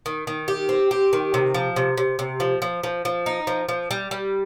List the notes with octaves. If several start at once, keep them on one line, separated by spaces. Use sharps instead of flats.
D#3
D#3
G4
C4
G4
D#3
C3
F3
C3
C3
C3
F3
F3
F3
F3
D#4
F3
F3
G3
G3